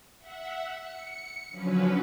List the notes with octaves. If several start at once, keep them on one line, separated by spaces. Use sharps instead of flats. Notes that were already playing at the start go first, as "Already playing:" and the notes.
E5 F#5
C#7
D3 F3 F#3 C#4 B4